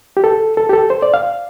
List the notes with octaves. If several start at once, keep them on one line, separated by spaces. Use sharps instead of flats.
G4
A4
A4
G4
A4
C5
D5
F5